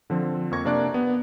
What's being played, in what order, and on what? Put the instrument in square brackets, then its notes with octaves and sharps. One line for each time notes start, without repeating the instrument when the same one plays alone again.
[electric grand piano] D3 F3 C4
F2 A#3 C4 C#6 G#6 A#6
C3 A#3 D4 D5 A#5 F#6
B3